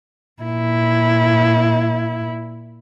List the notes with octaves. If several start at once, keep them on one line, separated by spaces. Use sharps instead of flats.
A#2 E4